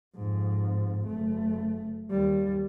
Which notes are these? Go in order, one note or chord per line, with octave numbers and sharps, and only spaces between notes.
F2 G#2
F#1 A3
D#2 G3